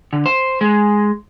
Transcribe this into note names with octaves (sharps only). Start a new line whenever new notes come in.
D3
C5
G#3